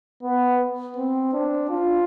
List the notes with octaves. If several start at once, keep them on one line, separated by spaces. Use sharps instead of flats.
B3
C4
D4
F4